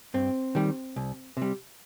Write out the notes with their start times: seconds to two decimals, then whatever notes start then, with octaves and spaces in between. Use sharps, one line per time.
0.14 G2 C4
0.55 D#3 G3
0.96 C2
1.37 C3 G3